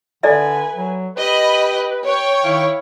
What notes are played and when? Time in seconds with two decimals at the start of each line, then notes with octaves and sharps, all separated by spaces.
0.23 D3 A4 B4 D5 E5 G#5
0.76 F#3
1.17 G4 B4 D#5 B5
2.06 C#5 G5
2.43 D#3 E4 F5